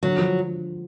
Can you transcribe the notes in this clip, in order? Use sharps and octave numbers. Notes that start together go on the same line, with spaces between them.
D3 F#3
F3